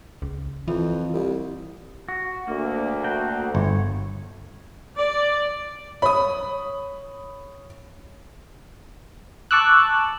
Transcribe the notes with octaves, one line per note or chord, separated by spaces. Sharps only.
C#2
F2 E3
C2
F#4
D2 A#3
A#3 F#4 G5
G1 C#5
D5
C#5 B5 D#6
A5 C#6 D6 E6 F#6